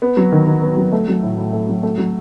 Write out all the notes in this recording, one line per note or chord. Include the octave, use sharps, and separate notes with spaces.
B3
F#3
D#3
D#3
B3
F#3
A3
F#3
A2
A2
A3
F#3
A3
F#3